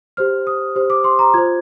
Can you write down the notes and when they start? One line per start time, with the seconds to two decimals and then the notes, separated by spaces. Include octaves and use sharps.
0.17 G4 C5 F6
0.47 D#6
0.76 G4 C5
0.90 D6
1.04 C6
1.19 A#5
1.34 F4 C5 G#6